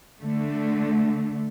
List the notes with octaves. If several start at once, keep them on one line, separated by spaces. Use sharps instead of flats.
D3 A3